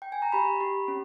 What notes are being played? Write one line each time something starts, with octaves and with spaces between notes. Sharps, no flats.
G5
G#5
A#5
G4 B5
G4
C#4